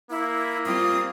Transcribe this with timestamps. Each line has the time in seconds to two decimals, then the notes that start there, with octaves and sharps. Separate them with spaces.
0.10 A#3 E4
0.66 G3 C4 F4 D#6